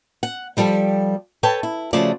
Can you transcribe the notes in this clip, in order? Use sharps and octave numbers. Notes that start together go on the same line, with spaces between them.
F#5
F3 G3 G4 A4
A4 B4 C#5 G5 A5
E4
C#3 F3 A3 F4 F#4 D5